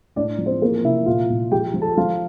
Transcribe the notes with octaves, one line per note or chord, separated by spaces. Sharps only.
A2 D4 D5
F3
C4 C5
E3 A#3 A#4
C3 E4 E5
A#2 F4 F5
A#2
F3 G4 G5
F3
A4 A5
F3 F4 F5